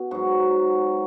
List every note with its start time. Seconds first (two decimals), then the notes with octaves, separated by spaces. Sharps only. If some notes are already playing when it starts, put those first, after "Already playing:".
Already playing: B2
0.11 G#2 F#3 F#4